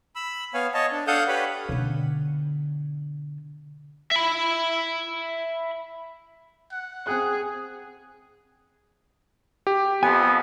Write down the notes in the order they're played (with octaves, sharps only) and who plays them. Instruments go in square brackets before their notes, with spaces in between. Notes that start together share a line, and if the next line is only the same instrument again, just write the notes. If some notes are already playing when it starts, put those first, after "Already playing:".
[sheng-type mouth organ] B5 E6
B3 C#5 F5 G#5
C#5 D#5 A5
D4
D4 A4 F5 F#5 D#6 G6
G4 B4 C#5 B5
[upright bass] B2 D3
[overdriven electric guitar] E5 B5
[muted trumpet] F#5
[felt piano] C4 G5 F#6 [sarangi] G#4
[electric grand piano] G4
[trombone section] F2 [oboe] B3 [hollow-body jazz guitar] G#5